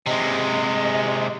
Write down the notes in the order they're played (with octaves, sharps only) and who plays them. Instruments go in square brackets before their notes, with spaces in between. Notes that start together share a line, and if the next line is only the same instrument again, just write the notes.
[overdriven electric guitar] C3 G#3 [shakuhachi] D#5